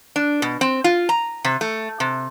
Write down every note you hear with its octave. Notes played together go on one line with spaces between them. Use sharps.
D4
B2
C4
F4
A#5
C3
A3
C3